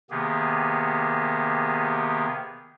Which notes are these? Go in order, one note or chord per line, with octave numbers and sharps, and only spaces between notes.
C3 D#3 A#3 B3 G4 G#4